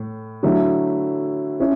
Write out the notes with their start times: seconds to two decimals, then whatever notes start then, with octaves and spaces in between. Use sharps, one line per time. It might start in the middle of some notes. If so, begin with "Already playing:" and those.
Already playing: A2
0.43 D3 F#3 A3 E4
1.60 C#4 E4